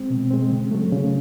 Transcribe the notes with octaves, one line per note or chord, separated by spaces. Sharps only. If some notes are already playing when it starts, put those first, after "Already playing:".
Already playing: G#3 C4
B2
G#3 C4
C#3
F#3 A3
C#3